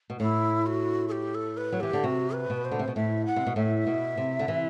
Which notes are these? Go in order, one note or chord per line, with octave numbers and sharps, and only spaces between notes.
B2
A2 E4
F#4
A4
G4
A4
B4
F#3
E3 G4
D3
C3 F#4
B4
B2
C5
D3
C3
B2
A2 E5
F#5
C3
B2
A2 E5
B2
C3
D3
C3 E3